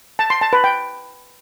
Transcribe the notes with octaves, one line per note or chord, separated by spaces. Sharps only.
A5
C6
A5
B4
G5